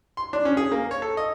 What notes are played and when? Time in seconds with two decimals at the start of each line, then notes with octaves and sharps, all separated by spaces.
0.17 C6
0.33 D4
0.45 C#4
0.57 G#4
0.72 A#3
0.91 C#5
1.02 A4
1.17 D#5